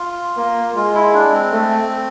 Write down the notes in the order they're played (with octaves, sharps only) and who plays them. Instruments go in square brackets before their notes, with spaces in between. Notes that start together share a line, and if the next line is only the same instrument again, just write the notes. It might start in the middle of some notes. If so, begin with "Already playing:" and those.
Already playing: [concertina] F4
[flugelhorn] A#3
[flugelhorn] G#3 [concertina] F4
[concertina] E4
D4
C4
[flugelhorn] A3